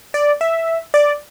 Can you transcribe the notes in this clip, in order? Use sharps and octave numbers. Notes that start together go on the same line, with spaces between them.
D5
E5
D5